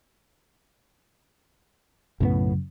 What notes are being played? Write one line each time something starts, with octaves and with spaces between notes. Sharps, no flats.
B1 F#2 A2 C#3 B3